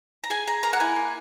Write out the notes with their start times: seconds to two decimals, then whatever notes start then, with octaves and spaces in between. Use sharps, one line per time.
0.24 A#5
0.30 G#4 G#5
0.47 G#4 A#5
0.63 A#3 A#5
0.73 F#5
0.80 E4 G#5
0.96 A#3